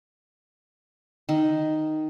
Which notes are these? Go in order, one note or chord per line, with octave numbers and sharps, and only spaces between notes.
D#3